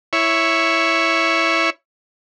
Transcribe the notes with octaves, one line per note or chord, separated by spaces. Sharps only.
E4 C#5